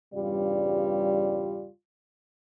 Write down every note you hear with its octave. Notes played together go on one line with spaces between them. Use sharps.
E2 G2 C#3 G3 F4 D5